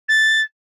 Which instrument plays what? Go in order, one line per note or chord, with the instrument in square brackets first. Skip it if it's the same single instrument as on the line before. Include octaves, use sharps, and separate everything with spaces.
[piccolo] A6